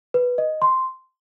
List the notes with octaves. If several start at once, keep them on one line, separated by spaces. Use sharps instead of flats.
B4
D#5
C6